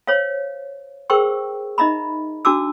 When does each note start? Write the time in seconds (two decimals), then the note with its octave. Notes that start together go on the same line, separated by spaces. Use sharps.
0.07 C5 C#5 F5
1.10 G#4 A#4 C5 G5 C#6 E6
1.78 D#4 D#5 E5 A#5 B5
2.45 D4 F#4 A5 D6 E6